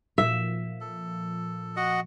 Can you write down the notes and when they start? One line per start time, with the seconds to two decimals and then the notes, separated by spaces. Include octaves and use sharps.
0.18 A#2 F3 E5
0.81 A4
1.76 F#4 D#5 F#5